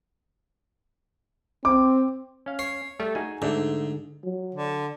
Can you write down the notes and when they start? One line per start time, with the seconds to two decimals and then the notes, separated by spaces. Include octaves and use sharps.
1.65 C4 D6
2.46 C#4 F5
2.59 C#5 C7
3.00 G3 A3
3.15 D#4 F#4 G#4 G#5
3.42 G#2 D3 A3 D4 A4
4.24 F#3
4.55 D3